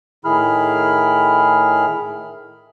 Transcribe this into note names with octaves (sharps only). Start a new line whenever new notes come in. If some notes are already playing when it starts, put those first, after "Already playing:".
A2 D#3 E4 G#4 B5 F6